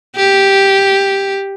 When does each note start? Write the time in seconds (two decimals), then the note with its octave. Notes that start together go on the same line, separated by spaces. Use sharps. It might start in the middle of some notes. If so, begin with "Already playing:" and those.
0.17 G4